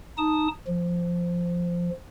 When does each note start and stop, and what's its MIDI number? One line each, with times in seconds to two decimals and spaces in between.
0.18 0.48 63
0.18 0.48 81
0.18 0.48 87
0.67 1.90 53